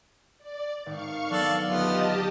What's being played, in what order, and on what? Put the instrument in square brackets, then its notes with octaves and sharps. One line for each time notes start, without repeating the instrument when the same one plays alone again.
[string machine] D5
[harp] G#1 [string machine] F5 C#6
[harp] F#3 B3 D4 [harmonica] A4 D5
[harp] D2 [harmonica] B3 F4 [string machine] G4 D#5 A5